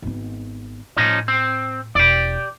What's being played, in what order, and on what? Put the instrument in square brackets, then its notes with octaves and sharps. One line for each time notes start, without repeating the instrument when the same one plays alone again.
[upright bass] G#1 B3
[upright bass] A2 [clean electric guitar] F3 C#4 D#4
[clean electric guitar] C4
[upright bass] E1 [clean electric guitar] G4 D5